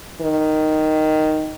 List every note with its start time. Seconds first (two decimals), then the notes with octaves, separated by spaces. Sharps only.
0.21 D#3